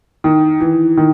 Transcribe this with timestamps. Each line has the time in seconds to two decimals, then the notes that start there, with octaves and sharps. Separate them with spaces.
0.24 D#3
0.61 E3
0.97 D#3